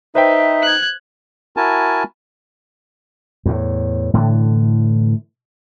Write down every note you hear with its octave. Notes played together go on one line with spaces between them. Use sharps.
D#4 B4 C5 E5 G5
F#6 G#6
E4 F#4 A#4 G#5 A5
E2 A2
A2 D3 E3